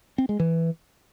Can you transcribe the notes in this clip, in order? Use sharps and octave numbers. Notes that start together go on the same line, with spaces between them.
C4
G#3
E3